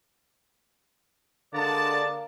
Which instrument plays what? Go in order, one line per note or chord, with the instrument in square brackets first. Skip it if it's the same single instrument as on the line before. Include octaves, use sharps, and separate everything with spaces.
[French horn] D3 [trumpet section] G#3 F#4 A5 [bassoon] A#3 [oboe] D5